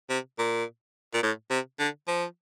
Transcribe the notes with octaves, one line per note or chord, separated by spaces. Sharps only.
C3
A#2
A#2
A2
C3
D3
F3